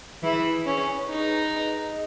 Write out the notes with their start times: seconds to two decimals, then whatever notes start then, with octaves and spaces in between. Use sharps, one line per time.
0.23 E3 E4 G#4
0.66 C#4 B4
1.08 D#4 G#4
1.52 D#5